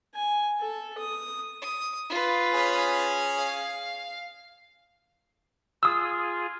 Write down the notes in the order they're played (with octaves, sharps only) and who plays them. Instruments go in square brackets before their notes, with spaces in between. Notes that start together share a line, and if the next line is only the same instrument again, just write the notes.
[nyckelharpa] G#5
A4
D#6
[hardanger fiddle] D#6
F4 B4
[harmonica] C#4 G#4
[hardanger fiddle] F5
[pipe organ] F4 G#4 [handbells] D#6 E6